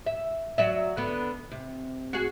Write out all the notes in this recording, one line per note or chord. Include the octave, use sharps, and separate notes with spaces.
E5
F#3 D5 E5
D3 B3
C3
F#4 G#4